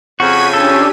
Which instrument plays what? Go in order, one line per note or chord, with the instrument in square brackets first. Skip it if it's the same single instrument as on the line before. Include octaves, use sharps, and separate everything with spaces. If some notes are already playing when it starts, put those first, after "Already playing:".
[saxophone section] F2 C#3 [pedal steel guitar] F#4 [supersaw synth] G#6 B6 D#7
[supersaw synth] C#4 D4 G4 [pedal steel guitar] A4